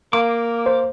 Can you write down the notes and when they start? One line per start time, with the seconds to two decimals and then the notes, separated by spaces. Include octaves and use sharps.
0.13 A#3 D6
0.66 C5